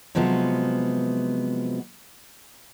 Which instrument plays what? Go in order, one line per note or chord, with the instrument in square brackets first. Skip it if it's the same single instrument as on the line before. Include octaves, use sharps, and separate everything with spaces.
[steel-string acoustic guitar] C3 F3 F#3 G#3 B3